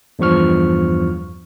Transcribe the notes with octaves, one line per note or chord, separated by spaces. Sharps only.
E2 G2 F3 C#6 F6